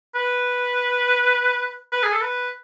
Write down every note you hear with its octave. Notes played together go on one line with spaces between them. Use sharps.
B4
B4
G#4
A4
B4